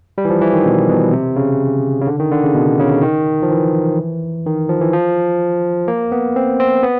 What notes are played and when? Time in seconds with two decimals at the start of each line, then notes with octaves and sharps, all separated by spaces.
0.18 G3
0.25 E3
0.30 F3
0.41 E3
0.53 D#3
0.65 B2
0.89 B2
1.12 C3
1.36 C#3
2.01 C#3
2.07 D3
2.19 D#3
2.31 D3
2.44 C#3
2.55 B2
2.79 C#3
3.03 D#3
3.42 F3
3.51 E3
4.46 D#3
4.69 F3
4.81 E3
4.93 F3
5.88 A#3
6.12 B3
6.36 C4
6.60 C4
6.83 B3